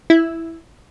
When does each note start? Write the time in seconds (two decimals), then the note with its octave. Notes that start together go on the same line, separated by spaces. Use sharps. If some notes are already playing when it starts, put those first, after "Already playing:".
0.10 E4